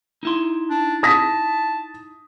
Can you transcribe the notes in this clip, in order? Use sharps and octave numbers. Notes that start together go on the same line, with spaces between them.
D#4 E4 C6
D4
A5 D#6 A#6 B6